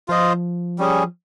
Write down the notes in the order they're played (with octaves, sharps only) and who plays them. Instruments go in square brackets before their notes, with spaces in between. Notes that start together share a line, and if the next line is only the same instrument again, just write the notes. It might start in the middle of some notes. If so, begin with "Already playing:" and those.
[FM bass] F3 [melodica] F4 C5 D#5
[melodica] G3 C#4 G#4